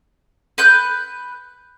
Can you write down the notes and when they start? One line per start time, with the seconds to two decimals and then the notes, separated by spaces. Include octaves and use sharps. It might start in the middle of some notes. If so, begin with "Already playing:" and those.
0.58 B4 F#6 G6